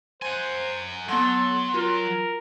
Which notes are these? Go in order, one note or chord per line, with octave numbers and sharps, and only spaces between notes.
C5 F#5 G#5 C6
F#3 B3 A4 F#5 C6 C#6
F4 F#4 A#4